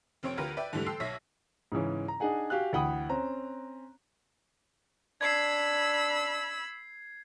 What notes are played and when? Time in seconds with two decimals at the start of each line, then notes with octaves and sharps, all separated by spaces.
0.23 F1 C4 C5 C#5 D7
0.37 D2 F4 G4 A#4 B4
0.57 B4 D5 E5 G5
0.73 G#2 D3 E3 G3 A3
0.86 A4 G5 C6 E6 C7
1.00 B1 C#5 E5 A#6 B6
1.72 G#2 C#3 E3 C#4
2.08 A#5
2.20 D4 D#4 G#4 F#5 G#5
2.50 F#4 G4 F5 G#5 F#6
2.73 D2 E3 F#5 G5 B5 D#6
3.09 C4 C#4 A#5
5.21 D4 B5 E6 G#6 C7